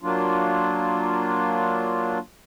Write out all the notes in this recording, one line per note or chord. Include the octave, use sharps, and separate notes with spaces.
F#3 A#3 D4 F4